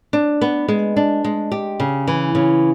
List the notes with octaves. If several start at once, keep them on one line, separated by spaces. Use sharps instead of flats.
D4
B3
G#3
D4
G#3
G4
C#3
E3
C#3